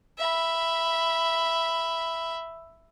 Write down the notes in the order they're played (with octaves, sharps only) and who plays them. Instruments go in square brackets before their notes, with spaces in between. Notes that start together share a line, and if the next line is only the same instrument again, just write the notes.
[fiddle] E5 B5